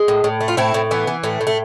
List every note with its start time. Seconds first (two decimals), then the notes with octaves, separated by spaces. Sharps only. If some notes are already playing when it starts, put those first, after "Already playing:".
Already playing: G#3
0.08 A2
0.24 A2
0.40 A3
0.48 F4
0.57 A2 C4 E4
0.74 A2
0.91 E3 B3
1.07 E3
1.24 A2 A3
1.41 A2
1.47 A3